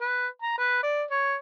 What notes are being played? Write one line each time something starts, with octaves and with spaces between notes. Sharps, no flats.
B4
A#5
B4
D5
C#5